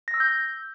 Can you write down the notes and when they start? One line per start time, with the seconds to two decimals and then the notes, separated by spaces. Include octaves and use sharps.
0.08 A#6
0.14 E6
0.20 G6